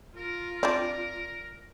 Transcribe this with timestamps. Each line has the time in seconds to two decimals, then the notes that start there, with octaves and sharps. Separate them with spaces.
0.17 F4 A#4
0.63 C4 D4 D5